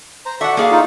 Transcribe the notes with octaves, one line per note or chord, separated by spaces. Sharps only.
C5 A#5
F#4 A4 D5 E5 F#5
A#3 G#4 F5
D#4 F4